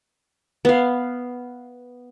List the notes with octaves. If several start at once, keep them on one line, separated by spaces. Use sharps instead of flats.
B3 F5